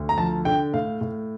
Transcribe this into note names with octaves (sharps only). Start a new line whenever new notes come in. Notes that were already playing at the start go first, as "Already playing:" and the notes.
Already playing: D2
A#5
F3 A5
D3 G5
A2 F5
A2